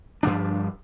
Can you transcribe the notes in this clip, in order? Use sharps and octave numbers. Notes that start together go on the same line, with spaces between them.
G2 F3 D4